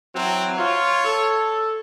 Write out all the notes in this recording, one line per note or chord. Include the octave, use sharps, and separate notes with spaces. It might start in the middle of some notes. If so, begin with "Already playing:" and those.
E3 F#3 C4
F4 C#5
A4